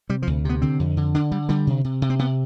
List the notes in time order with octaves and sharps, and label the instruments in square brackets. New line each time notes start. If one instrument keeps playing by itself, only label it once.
[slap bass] C3 G3
F3
D2
C3 B3
D3 C4
F2
D3
D3 D4
D3 G3
D3 G3
C3
C3
C3
C4
C3 B3